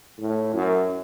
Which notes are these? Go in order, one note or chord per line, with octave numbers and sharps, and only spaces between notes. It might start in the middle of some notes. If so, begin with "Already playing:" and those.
A2
F#2